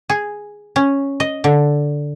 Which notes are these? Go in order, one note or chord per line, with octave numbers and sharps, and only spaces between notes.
G#4
C#4
D#5
D3